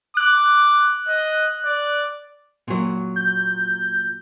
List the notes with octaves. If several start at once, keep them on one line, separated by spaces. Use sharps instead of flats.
D6 F#6
D#5
D5
A#2 F#3
G6